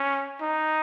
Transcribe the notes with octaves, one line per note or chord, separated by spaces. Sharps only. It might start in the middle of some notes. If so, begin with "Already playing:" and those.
Already playing: C#4
D#4